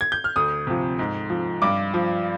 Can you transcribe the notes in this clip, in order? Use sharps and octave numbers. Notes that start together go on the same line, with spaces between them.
G#6
G6
F6
D2 D#6
C3 F3
G#2
F3
G2 D6
F3